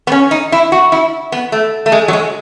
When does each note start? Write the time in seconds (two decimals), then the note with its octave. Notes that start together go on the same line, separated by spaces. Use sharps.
0.07 B3
0.12 C#4
0.31 D#4
0.52 E4
0.72 F#4
0.92 E4
1.32 B3
1.52 A3
1.86 A3
1.92 G#3
2.08 F#3
2.13 G#3